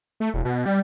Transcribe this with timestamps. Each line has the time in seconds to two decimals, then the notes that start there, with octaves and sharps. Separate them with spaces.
0.20 A3
0.34 E1
0.45 B2
0.66 G3